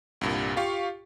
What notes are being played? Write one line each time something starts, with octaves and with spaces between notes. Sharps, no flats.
C2 G2 A#2
F4 G4 F5 C#6